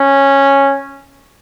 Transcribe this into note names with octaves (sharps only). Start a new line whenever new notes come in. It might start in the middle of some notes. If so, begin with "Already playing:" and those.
Already playing: C#4